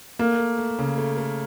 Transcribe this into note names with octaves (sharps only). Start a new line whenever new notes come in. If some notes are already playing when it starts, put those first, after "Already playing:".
A3 A#3
A3
A3
C#3
A3
A3